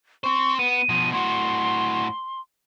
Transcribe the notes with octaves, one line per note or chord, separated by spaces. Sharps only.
C4 C5 C#6
B3 D#7
B2 F3
A2 F#4 C6